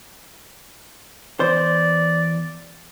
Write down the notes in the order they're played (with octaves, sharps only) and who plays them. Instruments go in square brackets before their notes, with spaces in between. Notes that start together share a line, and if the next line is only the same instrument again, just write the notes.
[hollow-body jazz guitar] E2 C5 [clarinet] D5